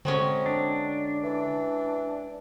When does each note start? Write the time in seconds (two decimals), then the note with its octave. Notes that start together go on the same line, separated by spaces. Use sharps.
0.05 D3 F#3 G#3 C4 C#4
0.46 D4
1.24 E3